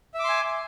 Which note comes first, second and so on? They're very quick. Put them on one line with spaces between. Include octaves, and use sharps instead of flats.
E5 D6 C6 G#5